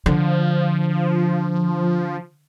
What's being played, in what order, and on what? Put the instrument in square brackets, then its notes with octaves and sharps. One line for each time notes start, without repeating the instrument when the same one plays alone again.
[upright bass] D3 [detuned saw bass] F3